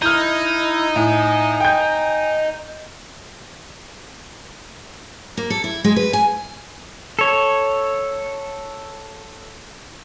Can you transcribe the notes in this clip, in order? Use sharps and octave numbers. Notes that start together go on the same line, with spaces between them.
D#4 E4 F6 G6
A2 G#5
G5 G6
A#3
A4
E4
G#3
B4
G#5
A4 C#5